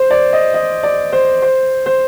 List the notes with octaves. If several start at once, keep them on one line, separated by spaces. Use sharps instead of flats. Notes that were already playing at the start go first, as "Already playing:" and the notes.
Already playing: C5
D5
D#5
D#5
D5
C5
C5
C5